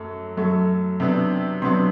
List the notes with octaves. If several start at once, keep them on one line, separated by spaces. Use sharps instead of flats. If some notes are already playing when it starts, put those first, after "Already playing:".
Already playing: F#2 F#3 A3
F#2 F#3 A3
C3 F#3 B3 D4
C3 F#3 B3 D4 C6